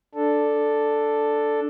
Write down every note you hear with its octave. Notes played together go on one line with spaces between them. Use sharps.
D4 A4